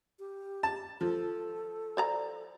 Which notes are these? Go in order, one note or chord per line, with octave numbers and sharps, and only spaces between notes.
G4
A5
F3 A4
C5 D5 A#5